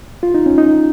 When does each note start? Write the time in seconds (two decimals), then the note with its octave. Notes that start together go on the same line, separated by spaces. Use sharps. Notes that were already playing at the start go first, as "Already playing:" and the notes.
0.23 F4
0.34 D#4
0.46 C#4
0.58 D#4